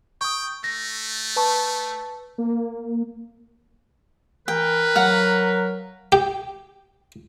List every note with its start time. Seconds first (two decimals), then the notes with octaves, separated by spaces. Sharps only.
0.21 G5 C#6 D#6
0.64 A3 A#6
1.36 B4 A5 C#6
2.38 A#3
4.48 E3 A#4 B4 G5
4.95 F#3 F5 F#5
6.12 G4